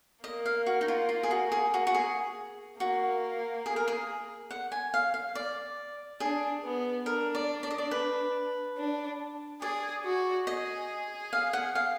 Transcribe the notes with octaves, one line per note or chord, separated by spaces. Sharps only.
A#3 D#5
F5
F#4
D#4
F4
F4
G#4
F#4
G#4
F#4
F#4
G#4
A#3 F#4
G#4
A#4
G#4
F#5
G#5
F5
F5
D5
D4 G#4
B3
D4 A#4
D5
D5
D#5
D5
B4
D4
G#4 D5
F#4
G#4 D#5
F5
F#5
F5